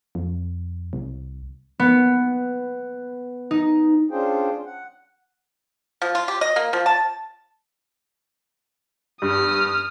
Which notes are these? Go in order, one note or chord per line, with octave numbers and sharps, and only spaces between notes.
F2
C2
B3
D#4
C#4 D4 F4 G#4 C5 G5
F#5
F3
F4
G4
D#5
A#3
F3
A5
G2 D#6 F6